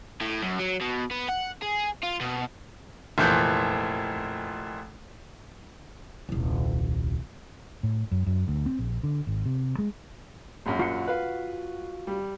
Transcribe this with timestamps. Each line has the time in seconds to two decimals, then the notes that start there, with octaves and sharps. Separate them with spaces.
0.21 A2
0.42 F#2
0.60 F#3
0.81 B2
1.11 B3
1.29 F#5
1.62 G#4
2.03 F4
2.21 B2
3.18 F1 A#2 E3 F3 G6
6.29 D#1 C2
7.83 A2
8.12 F#2
8.27 F#2
8.48 D2
8.66 C4
8.79 A#1
9.03 D3
9.27 G#1
9.46 C3
9.79 G#3
10.66 A#1 F#2
10.79 F4 F#4 F#5
11.08 B4 F5
12.07 G3